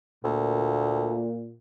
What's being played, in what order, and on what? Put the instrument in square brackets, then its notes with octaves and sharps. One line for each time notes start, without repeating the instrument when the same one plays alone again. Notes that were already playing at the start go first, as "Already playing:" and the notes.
[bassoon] D2 [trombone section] A#2